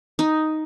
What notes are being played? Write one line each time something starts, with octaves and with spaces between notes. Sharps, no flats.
D#4